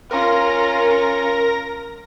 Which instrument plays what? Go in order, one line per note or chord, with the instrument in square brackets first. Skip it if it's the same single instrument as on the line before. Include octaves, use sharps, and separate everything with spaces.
[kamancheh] C#4 F4 [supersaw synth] A#4 A#6